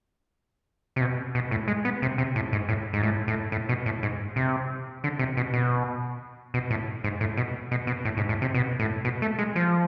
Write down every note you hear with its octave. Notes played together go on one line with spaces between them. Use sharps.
C3
B2
B2
A2
G#3
B3
C3
C3
A2
G#2
A2
G#2
A2
A2
A2
B2
A2
G#2
C3
D3
C3
B2
B2
B2
A2
G#2
A2
B2
B2
B2
A2
G#2
A2
C3
B2
A2
B2
A3
G#3
F3